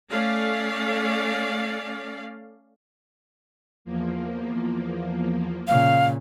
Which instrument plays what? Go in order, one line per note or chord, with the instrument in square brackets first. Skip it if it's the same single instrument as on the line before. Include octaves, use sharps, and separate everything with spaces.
[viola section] A3 C#4 D5 F5
[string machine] E2 F3 A#3
[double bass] A#2 C#3 [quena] F5